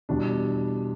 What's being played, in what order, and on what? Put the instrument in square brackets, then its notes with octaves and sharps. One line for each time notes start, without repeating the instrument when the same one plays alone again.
[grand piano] E2 B2 G3 D4